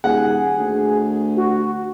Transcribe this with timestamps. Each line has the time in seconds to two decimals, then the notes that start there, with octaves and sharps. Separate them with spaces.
0.04 D#1 G#4 F#5
0.58 D2
1.37 F#4